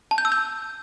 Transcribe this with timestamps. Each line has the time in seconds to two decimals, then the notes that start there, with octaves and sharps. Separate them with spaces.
0.11 A5
0.18 G6
0.25 E6
0.32 G6